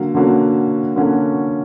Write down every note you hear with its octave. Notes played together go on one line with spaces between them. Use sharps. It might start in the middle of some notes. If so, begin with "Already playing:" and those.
Already playing: D3 F#3 A#3
D3 F#3 A#3 C#4 F#4
D3 F#3 A#3 C#4 F#4